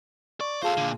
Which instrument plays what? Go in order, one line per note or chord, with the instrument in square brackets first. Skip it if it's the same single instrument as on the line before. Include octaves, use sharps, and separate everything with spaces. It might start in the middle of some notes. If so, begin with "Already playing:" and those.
[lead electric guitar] D5 [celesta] C#6
[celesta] F4 G#4 A5 [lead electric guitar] A4 C5 [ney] F5
[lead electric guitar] A#2 D3